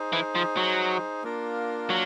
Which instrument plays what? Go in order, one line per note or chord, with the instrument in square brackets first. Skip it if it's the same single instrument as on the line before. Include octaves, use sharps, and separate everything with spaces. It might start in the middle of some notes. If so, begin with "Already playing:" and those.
Already playing: [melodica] D#4 G#4 C5
[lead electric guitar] E3
F3
F#3
[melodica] A#3 D4 F4 A#4
[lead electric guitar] F#3